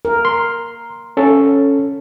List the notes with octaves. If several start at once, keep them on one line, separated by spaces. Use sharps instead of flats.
A#4
C6
C#4 A4